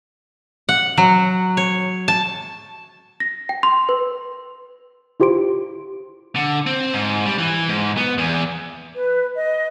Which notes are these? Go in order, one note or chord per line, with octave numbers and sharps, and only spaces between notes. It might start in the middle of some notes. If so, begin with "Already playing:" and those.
F#5
F#3
C#5
A5
A#6
G5
C6
B4
E4 F4 G4 C5 C6 D7
D3
C4
G#2
G3
E3
G#2
B3
E2
B4
D#5